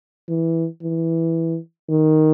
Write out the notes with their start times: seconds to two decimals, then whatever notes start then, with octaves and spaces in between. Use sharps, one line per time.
0.29 E3
0.83 E3
1.90 D#3